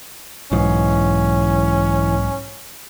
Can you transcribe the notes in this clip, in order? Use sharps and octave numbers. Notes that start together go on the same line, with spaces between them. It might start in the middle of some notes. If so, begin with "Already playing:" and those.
B1 G#2 E3 C#4